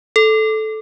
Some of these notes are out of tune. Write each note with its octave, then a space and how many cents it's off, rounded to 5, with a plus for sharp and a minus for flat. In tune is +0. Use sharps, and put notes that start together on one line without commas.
A4 -10